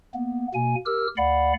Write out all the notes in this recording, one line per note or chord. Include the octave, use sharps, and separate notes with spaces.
A#3 B3
B2 A#3 G#5
G4 A#4 E6 F6
D2 D5 F5 F#5 B5